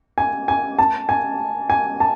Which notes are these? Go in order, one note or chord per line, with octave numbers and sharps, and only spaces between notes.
G#5
G#5
A5
G#5
G#5
A5